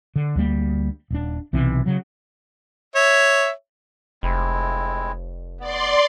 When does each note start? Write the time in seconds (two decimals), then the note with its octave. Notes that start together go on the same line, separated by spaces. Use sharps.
0.16 D3
0.35 D2 G3 A#3
1.10 D#1 D4
1.53 B1 C3 E3
1.86 C#3 F#3
2.95 C#5 E5
4.23 F1 G#3 C4 E4
5.60 B3 D5 C6